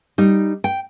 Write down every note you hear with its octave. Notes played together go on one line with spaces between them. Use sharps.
G3 D#4
G5